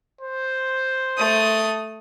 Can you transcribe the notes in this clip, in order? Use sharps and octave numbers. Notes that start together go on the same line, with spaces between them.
C5
A3 D#6